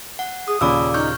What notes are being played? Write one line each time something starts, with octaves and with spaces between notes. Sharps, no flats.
F#5
G#4 D#6
D#2 A#2 C#3 D5 B5 D6 E6
D#4 C#6 F6 G6